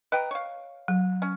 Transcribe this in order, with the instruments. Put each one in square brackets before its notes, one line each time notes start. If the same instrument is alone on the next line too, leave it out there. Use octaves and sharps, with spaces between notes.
[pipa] B4 G5 A#5 [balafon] D#5
[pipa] C#5 F5
[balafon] F#3
[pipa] C#4